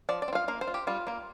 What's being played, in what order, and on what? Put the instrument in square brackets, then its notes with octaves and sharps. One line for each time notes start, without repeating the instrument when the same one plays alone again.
[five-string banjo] F3 D5
D5
C4
F4 F5
A#3 F5
C5
F4
G4
G3 F4
A#3 F4